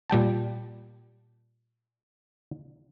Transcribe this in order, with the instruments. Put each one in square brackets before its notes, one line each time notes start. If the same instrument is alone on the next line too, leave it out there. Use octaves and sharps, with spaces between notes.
[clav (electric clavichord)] A#2 G3 G5 A5